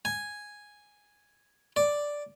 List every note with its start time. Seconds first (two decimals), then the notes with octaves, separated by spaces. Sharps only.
0.05 G#5
1.76 D5